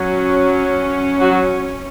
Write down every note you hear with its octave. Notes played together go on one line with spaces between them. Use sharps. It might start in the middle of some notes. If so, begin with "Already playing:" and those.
Already playing: F#3 C#4
F#3 F#4